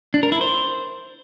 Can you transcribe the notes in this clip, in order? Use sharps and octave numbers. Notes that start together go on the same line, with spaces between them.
D4
A#4
E4
C5